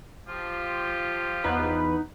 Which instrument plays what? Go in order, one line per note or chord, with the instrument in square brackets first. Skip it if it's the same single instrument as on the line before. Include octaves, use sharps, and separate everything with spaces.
[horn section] F3 F4 G4
[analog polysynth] E2 B3 B4 [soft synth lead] D#4